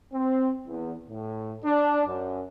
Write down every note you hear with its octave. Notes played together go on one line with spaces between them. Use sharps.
C4
E2
A2
D4
F#2